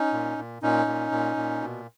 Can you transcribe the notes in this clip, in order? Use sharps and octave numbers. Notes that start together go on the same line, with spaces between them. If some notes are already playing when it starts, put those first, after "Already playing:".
Already playing: C#4 D#4
A#2
A#2
A#2 C#4 D#4
A#2
A#2
A#2
B2